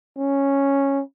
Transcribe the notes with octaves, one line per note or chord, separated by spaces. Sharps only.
C#4